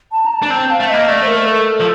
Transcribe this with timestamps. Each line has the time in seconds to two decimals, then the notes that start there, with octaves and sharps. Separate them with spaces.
0.12 A5
0.26 A#5
0.31 A5
0.42 D4
0.50 C4 A5
0.70 F5
0.80 A3
0.89 A#3 D#5
1.08 A3 D5
1.22 C5
1.28 A#4
1.47 A4
1.80 F3